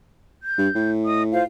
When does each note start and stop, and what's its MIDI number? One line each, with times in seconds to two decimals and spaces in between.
0.44 0.92 91
0.58 0.69 43
0.75 1.46 45
1.04 1.22 75
1.04 1.22 87
1.32 1.43 65
1.32 1.43 72
1.32 1.43 77